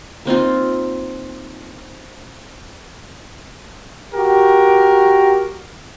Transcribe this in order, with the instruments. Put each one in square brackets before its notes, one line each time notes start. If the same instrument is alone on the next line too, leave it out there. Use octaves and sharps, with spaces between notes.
[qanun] A#3 C4 D#4 F4
[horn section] F#4 G4 A#4